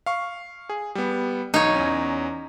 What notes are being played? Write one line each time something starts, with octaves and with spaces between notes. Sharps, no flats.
F5 C#6
G#4
G3 B3
B1 D#4 C#5
E2 C#4